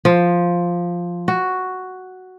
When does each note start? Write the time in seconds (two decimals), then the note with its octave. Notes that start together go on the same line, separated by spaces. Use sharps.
0.05 F3
1.28 F#4